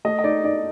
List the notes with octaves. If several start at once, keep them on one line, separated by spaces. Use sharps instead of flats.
A3 D#5
D#5
D#4 D5
D#4 D5